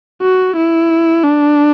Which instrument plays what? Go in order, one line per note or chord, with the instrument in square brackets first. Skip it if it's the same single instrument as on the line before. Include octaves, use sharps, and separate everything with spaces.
[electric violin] F#4
E4
D4